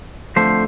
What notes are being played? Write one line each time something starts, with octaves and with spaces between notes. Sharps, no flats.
F2 D3 F3 A3 C5